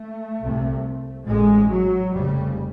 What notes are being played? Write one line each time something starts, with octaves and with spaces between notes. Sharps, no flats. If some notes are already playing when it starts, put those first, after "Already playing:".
Already playing: A3
C2 C3
A1 G#2 G#3
F#3
F1 F2 C#3 G3